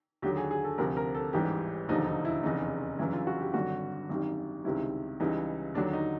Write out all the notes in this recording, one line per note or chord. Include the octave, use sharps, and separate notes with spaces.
D#2 D3 F#3 G4
G#4
G#4
A4
D2 C3 F3 A#4
A#4
A4
A1 G#2 E3 G3 G4
E1 D#2 D3 F3 D#4
D#4
E4
F1 E2 C#3 D#4
G1 F#2 C#3 E3 E4
F4
F#4
G4
G#1 G2 D3 F#3 F#4
G#1 F#2 D#3 G3
C#2 C3 D#3 G3 E4
C#2 C#3 E3 G3 D#4
D#2 D3 F#3 D4
D#4